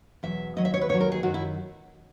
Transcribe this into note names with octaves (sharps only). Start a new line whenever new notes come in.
E2 B2 F#3 E5
D#2 D#3 F#3 D#5
E5
C#5
B4
D#2 D#3 F#3 C#5
A#4
G#4
F#2 D#3 F#3 F#4
E4